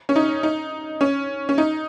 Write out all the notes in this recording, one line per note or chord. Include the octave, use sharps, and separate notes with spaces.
C#4
D#4
D#4
C#4
C#4
D#4